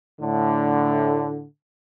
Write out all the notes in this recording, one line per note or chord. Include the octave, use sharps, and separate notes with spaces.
A2 D3